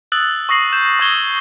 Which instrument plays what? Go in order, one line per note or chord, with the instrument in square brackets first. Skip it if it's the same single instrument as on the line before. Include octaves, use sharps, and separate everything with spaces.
[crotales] D#6 E6 F#6 A6 F#7
C#6 D#6 A#6 C7 F#7
G6 E7
C#6 D#6 E6 G#6 E7 G7